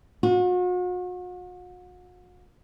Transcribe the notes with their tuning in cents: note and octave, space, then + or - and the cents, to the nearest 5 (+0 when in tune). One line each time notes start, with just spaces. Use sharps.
F#4 -40